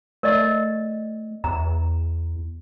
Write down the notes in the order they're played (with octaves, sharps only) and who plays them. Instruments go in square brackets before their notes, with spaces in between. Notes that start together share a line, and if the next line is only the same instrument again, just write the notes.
[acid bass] A3 [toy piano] A#4 D5 D#5
[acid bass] E2 [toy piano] A#5